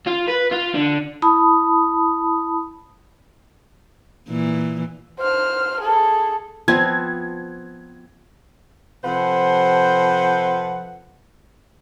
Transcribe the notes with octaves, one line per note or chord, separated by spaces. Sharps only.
F4
B4
F4
D3
E4 A5 B5 D#6
A#2 E3
C5 F6
G#4 A4
F3 B3 C4 G#6
C3 F3 A4 B4 C5 F#5